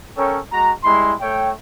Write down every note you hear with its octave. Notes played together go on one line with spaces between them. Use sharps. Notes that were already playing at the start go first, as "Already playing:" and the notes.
C#4 A4 A#4 C#5 G5
G#3 F#4 A#5
G3 G#3 E4 C6
A3 C#5 E5 G5